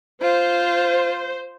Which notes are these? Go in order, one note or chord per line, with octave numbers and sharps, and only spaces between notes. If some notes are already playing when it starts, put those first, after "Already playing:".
F4 C5